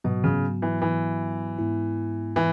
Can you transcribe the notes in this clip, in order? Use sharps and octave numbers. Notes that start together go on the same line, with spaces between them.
G#2 B2 F#3 B3 F#4
C#3
E3
E3
G#2 G#3 B3 E4
E3